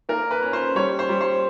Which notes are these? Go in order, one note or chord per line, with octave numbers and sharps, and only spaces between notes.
A#3 A#4
B4
C#4
C5
G3 C#5
C5
G3
C5